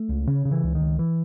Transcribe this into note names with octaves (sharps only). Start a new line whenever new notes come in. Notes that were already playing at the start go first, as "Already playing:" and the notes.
Already playing: A3
C#2
C#3 C#4
C#3
E3
C#2
D#3
C#2
E3